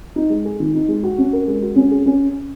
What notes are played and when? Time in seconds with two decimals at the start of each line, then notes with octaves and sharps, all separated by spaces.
0.16 D#4
0.30 G#3
0.45 G#4
0.60 D#3
0.74 D#4
0.88 G#3
1.03 F#4
1.18 C#4
1.33 A#4
1.48 G#3
1.62 F#4
1.76 C#4
1.91 G#4
2.06 C#4